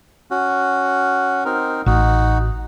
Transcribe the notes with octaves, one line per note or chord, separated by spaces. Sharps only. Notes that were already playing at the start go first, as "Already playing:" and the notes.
C#4 F#4
C4 D#4 A#4
A1 D#4 F#4